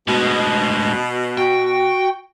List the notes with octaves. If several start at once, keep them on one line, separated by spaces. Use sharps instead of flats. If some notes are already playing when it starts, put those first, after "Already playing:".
D2 B2 G#3
F#4 G5